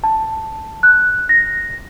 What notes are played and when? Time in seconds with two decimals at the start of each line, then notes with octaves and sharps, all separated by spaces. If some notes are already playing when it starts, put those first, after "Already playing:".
0.04 A5
0.83 F#6
1.29 A#6